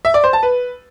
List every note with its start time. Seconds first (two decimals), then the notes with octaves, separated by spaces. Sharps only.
0.05 E5
0.14 D5
0.24 C5
0.33 A5
0.43 B4